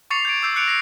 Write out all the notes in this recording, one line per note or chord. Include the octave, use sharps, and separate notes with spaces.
C#6 D6 A6 C7 C#7 F7
G6 G#6 D7
D6 E6 G6 C7
F#6 C#7 D7 F7
A#6 C7 D7